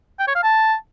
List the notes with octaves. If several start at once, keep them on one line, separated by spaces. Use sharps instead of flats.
G5
C#5
F5
A5